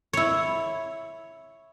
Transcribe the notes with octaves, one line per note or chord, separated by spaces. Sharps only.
E4 C#5